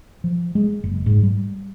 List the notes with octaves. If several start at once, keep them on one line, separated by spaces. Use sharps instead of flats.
F3
G#3
F#1
G#2
G3